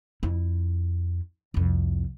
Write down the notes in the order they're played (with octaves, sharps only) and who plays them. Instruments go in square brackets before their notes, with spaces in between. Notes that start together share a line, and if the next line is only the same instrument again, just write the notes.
[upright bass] F2 E4
C2 F2